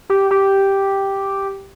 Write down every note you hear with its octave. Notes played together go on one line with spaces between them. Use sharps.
G4
G4